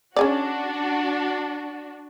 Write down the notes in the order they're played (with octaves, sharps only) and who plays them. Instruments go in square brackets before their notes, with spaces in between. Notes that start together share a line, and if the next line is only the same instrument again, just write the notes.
[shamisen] C#4 G#4 D5 [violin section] D4 F#4